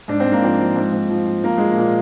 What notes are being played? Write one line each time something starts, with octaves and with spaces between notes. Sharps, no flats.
G#2 D4
C4
G#2
A#3
F3 C4
F3
G#2
G#2
F3
F3
F3 A#3
F3 G#3
A#3
A#2